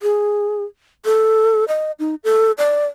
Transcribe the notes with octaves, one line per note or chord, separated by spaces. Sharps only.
G#4
A4
D#5
D#4
A4
D5